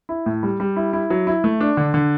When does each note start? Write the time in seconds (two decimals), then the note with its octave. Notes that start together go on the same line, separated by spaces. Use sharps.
0.09 E4
0.26 A2
0.43 G3
0.60 G3
0.76 E4
0.93 E4
1.10 F#3
1.27 E4
1.44 A3
1.61 D4
1.77 D3
1.94 D3